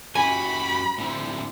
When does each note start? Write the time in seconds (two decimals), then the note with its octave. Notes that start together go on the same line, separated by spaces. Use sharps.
0.15 F#2 F#4 G4 G#5 B5
0.98 A2 D3 C4